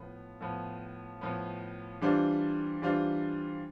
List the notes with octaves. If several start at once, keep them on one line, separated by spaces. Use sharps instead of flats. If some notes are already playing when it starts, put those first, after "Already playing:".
Already playing: A2 F3 B3
A2 F3 B3
A2 F3 B3
E3 G3 D4 F4 C5
E3 G3 D4 F4 C5